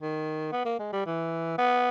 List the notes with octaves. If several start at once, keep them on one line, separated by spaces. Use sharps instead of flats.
D#3
B3
A#3
G#3
G3
E3
B3